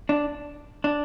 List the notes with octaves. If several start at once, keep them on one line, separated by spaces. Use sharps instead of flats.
D4
D4